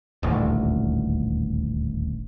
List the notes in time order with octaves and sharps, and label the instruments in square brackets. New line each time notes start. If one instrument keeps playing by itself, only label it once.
[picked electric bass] D#1 A1 D2